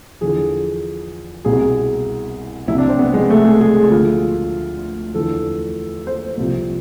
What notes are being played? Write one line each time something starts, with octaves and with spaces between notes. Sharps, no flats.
E2 D3 F3 G#4
C2 B2 G#4
C2 C3 E3 E4
D4
C4
B3
G#3
A3
G#4
G#4
D2 D3 F3 F4
E2 D3 F3 A4
C5
C2 C3 F3